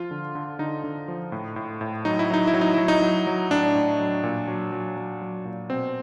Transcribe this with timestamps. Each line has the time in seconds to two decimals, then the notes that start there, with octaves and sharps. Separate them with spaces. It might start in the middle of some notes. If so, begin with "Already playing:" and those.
Already playing: F3 F4
0.11 D3
0.35 D3
0.59 D3 D#4
0.84 D3
1.08 F3
1.32 A2
1.56 A2
1.81 A2
2.05 F#3 D#4
2.19 E4
2.30 F#3 D#4
2.47 E4
2.54 F#3
2.61 D#4
2.74 F#3 E4
2.88 D#4
3.02 F#3
3.27 F#3
3.51 A2 D4
3.75 A2
3.99 F#3
4.24 A#2
4.48 F#3
4.72 F#3
4.97 F#3
5.22 F#3
5.45 A#2
5.70 B2 C4